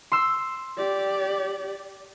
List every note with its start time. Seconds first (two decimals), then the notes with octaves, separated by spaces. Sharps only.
0.12 C6 E6
0.78 G4 D5